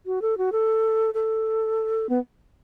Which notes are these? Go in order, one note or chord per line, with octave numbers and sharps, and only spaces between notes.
F#4
A4
F#4
A4
A4
B3